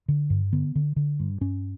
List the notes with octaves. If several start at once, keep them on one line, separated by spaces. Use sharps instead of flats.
D3
G2
D3 B3
D3
D3
G2
G2 C#4